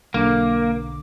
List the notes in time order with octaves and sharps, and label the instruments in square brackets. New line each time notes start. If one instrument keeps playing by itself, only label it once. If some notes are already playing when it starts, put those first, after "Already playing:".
[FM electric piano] B1 D3 D6 [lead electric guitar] A#3